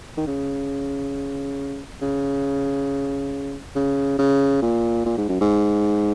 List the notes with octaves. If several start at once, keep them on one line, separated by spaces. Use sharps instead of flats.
D#3
C#3
C#3
C#3
C#3
A#2
A#2
G#2
F#2
G#2